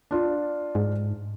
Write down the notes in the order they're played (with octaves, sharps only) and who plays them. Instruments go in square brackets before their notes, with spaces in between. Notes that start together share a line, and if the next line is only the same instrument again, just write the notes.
[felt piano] D4 F4
[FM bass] G#2